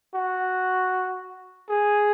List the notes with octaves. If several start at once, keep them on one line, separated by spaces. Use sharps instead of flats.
F#4
G#4